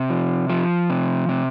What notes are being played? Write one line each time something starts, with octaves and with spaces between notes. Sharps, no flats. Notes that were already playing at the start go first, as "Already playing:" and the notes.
Already playing: C3
F3
F3
C3
C3